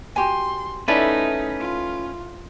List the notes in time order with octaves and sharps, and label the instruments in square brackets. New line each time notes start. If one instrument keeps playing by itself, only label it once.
[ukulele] F#4 G4 G#5 [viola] C6
[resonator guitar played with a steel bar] A3 [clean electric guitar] C#4 B4 [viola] D#4 [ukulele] E4 A4 D5
[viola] F4